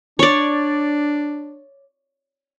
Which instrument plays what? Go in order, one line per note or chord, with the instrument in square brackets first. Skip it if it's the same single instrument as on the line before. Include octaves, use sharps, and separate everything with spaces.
[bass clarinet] D4 [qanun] C#5 D5